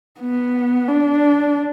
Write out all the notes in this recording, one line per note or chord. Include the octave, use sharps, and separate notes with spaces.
B3
D4